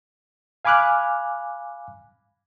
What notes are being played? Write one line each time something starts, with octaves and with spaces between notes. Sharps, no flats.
F5 G#5 B5 D6 F6 F#6